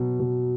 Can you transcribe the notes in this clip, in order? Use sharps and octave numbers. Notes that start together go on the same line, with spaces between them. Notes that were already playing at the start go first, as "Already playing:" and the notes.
Already playing: B2 F#3
B2